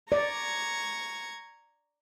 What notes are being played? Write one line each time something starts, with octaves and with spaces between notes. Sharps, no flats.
D5 A#5 C#6 G#6